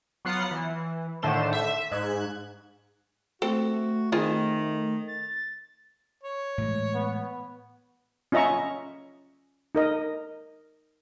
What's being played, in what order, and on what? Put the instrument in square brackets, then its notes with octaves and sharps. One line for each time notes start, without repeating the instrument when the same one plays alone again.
[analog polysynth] F#3 B3 F4 F#5 F6 C7
E3
A2 D3 D#3 A3 C5 E7
E5
G#2 F#6 G#6
[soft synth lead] A3 [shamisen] C4 A4 [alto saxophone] F#4
[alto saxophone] D#3 [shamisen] C4 F4 G#4
[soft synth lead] A6
[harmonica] C#5
[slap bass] A2 E3 G#3
[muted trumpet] B3
[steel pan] C#4 F4 D#5 E5 A#5 C#6
D#4 A#4 D#5